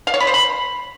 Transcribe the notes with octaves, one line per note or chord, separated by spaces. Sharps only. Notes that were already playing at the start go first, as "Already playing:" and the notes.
F5
C#5
B5
C5
B5